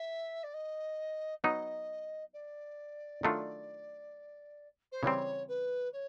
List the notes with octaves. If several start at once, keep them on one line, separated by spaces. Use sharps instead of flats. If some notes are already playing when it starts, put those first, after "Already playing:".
Already playing: E5
D5
D#5
F#3 B3 D#4 D#5
D5
D#3 F#3 A3 D4 F4
C5
C#3 E3 G3 C4 C#5
B4
C#5